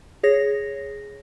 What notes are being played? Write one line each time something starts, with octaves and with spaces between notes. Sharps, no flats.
G#4 C#5 A#6